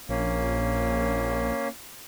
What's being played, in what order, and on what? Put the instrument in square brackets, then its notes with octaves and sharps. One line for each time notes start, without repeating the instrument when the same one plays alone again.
[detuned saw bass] A#1 [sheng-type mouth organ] A#3 C#4